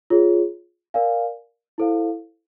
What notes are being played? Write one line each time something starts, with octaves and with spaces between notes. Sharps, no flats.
F4 G#4 C#5
A#4 D5 F5 G#5
E4 A4 C5 F5